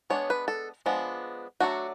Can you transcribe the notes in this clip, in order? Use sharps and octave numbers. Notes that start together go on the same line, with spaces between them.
G#3 B3 D4 C#5
B4
A4
F3 G#3 B3 D4
F#3 A3 D4 F#4